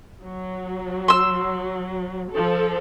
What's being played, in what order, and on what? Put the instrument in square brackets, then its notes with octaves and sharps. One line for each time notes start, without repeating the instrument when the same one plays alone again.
[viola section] F#3
[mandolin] C6 E6
[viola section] F3 A4